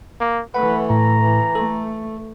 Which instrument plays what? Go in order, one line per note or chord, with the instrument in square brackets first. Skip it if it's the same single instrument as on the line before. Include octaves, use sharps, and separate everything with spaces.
[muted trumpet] A#3
[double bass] E3 A3 [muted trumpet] B4 [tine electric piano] F#5
[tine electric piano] A2 [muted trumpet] A#5
[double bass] E3
[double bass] A3 [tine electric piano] A4